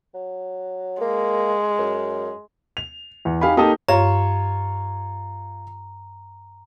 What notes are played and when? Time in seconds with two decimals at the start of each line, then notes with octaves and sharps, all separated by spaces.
0.14 F#3
1.01 G#3 A#3
1.79 F#2
2.77 F7
3.25 E2
3.41 D#4 G4 F5 G#5 B5
3.57 A#3 D#4 G4 A4 A5 D#6
3.89 G2 F4 C#5 A#5